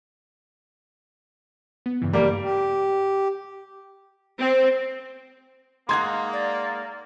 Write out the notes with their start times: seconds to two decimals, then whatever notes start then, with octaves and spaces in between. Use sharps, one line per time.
1.86 B3
2.02 G2 C#3 E3
2.13 G3 A#3
2.43 G4
4.39 C4
5.89 G#3 A#3 D#4 F#5 C6 G#6
6.33 D5